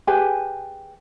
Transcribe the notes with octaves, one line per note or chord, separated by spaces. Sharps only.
G4 G#4 B4 G#5